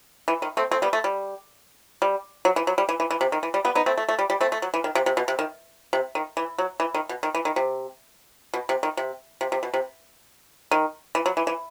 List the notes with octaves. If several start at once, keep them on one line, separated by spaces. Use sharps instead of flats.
E3
D#3
A3 C4
A3 C4
G3 B3
A3
G3
G3
F#3
E3
F#3
G3
E3
E3
E3
C3
D#3
E3
G3
G3 B3
B3 D#4
A3 C4
A3
A3
G3
G3
A3 C4
A3
F#3
E3
D#3
C3
C3
B2
C3
D#3
C3
D#3
E3
F#3
E3
D#3
B2
D#3
E3
D#3
C3
B2
C3
D#3
C3
C3
C3
B2
C3
D#3
E3
F#3
E3
E3